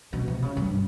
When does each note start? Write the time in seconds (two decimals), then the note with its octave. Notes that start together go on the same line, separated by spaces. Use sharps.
0.13 B2
0.28 C3
0.42 C#3
0.57 G2